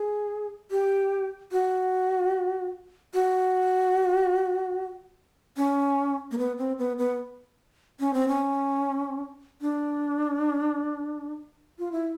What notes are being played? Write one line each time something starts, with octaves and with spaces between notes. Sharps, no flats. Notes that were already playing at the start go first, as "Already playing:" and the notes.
Already playing: G#4
G4
F#4
F#4
C#4
A#3
B3
C4
B3
B3
C#4
C4
C#4
D4
F4
E4